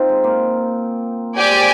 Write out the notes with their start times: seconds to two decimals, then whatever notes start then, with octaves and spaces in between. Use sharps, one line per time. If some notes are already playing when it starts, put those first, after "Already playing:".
Already playing: C4 D#4 F4
0.09 G#3
0.24 A#3
1.35 C4 G4 D5 G#5
1.50 G#3